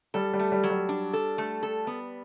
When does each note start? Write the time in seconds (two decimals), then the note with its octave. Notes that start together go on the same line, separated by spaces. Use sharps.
0.14 G3 A4
0.34 G3
0.39 A3
0.52 G3
0.63 F#3
0.70 G3
0.89 D4
1.13 A4
1.38 A3
1.63 A4
1.87 B3